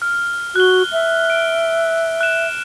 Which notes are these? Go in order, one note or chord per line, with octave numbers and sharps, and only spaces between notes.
F6
F#4 F#6 G7
E5
D7
F#6 E7